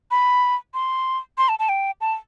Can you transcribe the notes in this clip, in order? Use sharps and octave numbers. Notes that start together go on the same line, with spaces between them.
B5
C6
C6
A5
A5
G5
A5